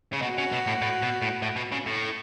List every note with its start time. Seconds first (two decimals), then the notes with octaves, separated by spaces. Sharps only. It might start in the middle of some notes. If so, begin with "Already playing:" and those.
0.13 C#3
0.22 B2 F#4
0.38 C#3
0.52 B2
0.67 A2
0.82 A2
1.02 B2
1.22 A2
1.42 A2
1.56 B2
1.72 C#3
1.87 A2